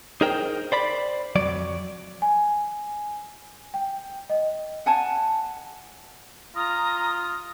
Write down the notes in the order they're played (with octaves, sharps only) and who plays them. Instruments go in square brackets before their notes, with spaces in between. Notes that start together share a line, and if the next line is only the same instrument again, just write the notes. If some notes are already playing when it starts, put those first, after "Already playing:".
[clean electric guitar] D#4 G#4 A#4 C5 G5
C5 D5 B5
F2 F#3 D5
[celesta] G#5
G5
D#5
[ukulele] F#5 G#5 A5
[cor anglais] F4 [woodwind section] A#5 [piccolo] D#6